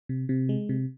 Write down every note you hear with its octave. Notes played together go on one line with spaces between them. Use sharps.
C3
C3
G#3
C3